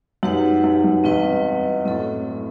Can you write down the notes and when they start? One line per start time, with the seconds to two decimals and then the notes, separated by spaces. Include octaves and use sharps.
0.23 F#2 D#4 G4 B4 F#5
0.64 F#2
0.84 F#2
1.04 E2 G2 C4 E4 B4 D#5 F#5
1.85 F#2 A2 C4 E4 A4